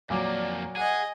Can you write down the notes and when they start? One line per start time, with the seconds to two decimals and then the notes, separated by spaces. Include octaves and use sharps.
0.10 F2 A#2 F#3 A#3 D5 D6
0.76 G#4 D#5 F#5 G#5